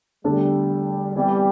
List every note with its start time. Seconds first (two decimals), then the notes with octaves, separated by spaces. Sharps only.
0.24 E2 D3 G3 A3 D4 A4
1.15 C3 E3 G3 B3